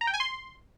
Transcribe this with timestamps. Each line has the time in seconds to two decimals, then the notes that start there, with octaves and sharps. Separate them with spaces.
0.01 A#5
0.07 G5
0.14 G#5
0.20 C6